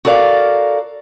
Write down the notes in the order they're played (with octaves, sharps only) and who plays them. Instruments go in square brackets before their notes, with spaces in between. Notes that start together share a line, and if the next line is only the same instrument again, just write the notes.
[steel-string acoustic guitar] F#4 A4 A#4 D5 F5